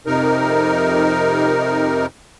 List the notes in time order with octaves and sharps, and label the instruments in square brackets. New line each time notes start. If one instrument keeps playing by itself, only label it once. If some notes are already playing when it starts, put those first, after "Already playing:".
[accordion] F2 C3 D#4 A#4